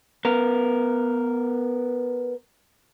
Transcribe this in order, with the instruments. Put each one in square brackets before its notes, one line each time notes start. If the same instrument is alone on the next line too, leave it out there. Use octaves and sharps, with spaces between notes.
[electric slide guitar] B3 A#4